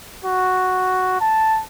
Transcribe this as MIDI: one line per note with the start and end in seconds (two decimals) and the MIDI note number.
0.24 1.20 66
1.21 1.61 81